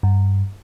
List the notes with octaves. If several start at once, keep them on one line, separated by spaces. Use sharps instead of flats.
G2